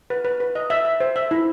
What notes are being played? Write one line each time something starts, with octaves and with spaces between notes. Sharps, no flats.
B4
B4
B4
D#5
E5
E5
C5
E5
E4